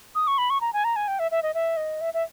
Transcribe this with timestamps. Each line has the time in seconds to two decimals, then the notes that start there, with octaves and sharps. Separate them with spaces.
0.15 D#6
0.27 C#6
0.38 B5
0.50 C#6
0.61 A#5
0.73 G#5
0.84 A#5
0.96 G#5
1.08 G5
1.19 E5
1.31 E5
1.43 D#5
1.54 E5
1.77 D#5
2.01 E5
2.14 E5